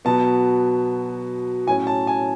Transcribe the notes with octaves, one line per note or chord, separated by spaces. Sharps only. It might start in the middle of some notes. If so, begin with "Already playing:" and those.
B2 F#3 B3 A5
A2 F#3 C#4 G#5
A5
G#5